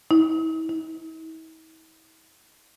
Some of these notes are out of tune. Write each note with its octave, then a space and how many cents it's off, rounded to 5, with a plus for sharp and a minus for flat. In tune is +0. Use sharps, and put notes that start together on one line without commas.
E4 -45
E4 -45